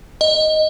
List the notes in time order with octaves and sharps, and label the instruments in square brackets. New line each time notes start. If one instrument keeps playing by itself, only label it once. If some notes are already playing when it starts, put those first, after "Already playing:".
[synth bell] D#5